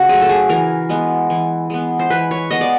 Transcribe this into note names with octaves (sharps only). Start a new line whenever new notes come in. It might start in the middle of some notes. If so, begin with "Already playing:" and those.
Already playing: C#3 F#4
F#3 A3 G#4
A4
G#4
E3 A#4
G#3 B3
E3
G#3 B3
C5
E3 B4
C#5
G#3 B3 D#5
D5